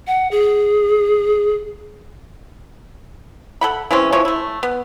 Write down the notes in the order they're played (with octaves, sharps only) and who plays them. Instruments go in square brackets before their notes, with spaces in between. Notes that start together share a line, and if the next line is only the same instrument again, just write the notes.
[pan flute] F#5
G#4
[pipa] A4 F#5 B5
E3 G#3 C4 C#4
E3 F3 C#5
A3 E4
B3